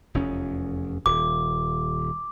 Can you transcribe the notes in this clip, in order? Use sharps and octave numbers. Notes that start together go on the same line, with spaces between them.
F1 E2 C#4
D#1 D6